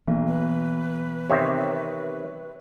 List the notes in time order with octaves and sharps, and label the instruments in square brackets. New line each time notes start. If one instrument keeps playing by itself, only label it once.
[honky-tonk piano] B1 [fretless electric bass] E3 A#3 B3
[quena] B4
[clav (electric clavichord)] C3 D#3 C4 [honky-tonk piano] C#5 E5